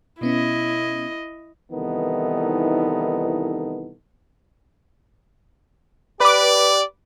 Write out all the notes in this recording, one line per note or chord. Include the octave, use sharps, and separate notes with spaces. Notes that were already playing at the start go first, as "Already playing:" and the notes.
B2 B3 C#4 E4 D#5
C2 D#3 E3 B3 D#4 A4
G4 B4 D5 D6